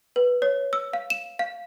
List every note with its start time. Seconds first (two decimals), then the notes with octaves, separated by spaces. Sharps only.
0.16 B4
0.42 C#5
0.73 E6
0.93 F5
1.10 E7
1.39 F5